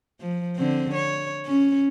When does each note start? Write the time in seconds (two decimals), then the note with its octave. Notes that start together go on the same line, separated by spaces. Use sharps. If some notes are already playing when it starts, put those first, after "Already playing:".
0.20 F3
0.57 D3 C4
0.95 C#5
1.46 C#4